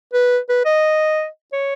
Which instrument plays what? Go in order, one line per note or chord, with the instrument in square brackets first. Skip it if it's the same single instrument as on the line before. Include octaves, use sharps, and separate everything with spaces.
[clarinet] B4
B4
D#5
C#5